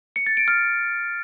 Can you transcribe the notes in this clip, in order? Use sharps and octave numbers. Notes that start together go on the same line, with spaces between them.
C#7
A6
D7
F6